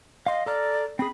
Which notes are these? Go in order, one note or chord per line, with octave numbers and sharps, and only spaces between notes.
D#5 F5 C6
A4 D5 A#5 F6
C4 G#4 B5